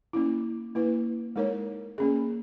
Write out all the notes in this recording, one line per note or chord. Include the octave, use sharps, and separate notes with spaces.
A#3 C#4 E4
A#3 E4 B4
G#3 D#4 A#4 C#5
A#3 C#4 G#4